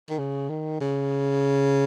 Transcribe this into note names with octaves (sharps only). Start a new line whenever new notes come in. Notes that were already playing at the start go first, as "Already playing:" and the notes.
D#3
C#3
D#3
C#3